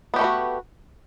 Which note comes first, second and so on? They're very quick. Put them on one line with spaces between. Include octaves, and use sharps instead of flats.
B3 G4 A3 B4 F#4